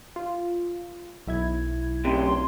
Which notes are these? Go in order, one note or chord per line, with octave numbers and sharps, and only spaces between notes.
F4
B1 E4 G#6
F#2 C3 C6